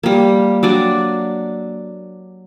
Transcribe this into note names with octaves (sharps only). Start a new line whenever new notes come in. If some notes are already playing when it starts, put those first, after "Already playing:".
G3 A#3
F#3 D4 D5